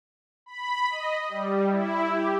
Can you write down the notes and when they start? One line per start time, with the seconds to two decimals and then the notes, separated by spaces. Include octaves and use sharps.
0.46 B5
0.89 D#5
1.29 G3
1.70 E4
2.09 G4